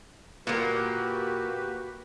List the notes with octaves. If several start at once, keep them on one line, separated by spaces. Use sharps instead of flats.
A#2 A#3 F#4 G4 B4